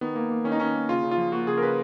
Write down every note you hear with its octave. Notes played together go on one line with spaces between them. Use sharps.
D#3 B3
A#3
A#3
D#3 C#4
D#4
D#3 C#4
A#3
C#3 F4
C#3
F4
F3
A#3 F#4
C#3 G#4
A#4
C#3 B4